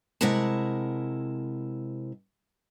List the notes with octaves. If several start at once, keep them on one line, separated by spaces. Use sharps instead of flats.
C3 G#3 E4 A#4 F#5 A5